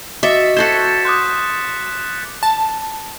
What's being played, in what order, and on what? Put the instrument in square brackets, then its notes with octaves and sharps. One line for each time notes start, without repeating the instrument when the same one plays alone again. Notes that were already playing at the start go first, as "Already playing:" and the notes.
[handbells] F#4 D#5 [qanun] E5 [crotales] D6 A6 C#7
[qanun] F#4 A4 C5 [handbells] G#6 A6 [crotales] B6 E7
[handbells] C6 D#6 [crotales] D6 F#6 G6
[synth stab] A5